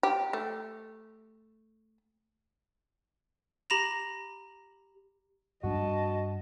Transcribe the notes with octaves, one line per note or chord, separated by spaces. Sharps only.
G4
A3
G4 A#5 B5 A#6 E7 F7
G2 G3 D4 F#4 D#5 A5